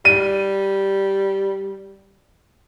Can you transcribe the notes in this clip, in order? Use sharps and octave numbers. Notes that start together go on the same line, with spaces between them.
G3 D#7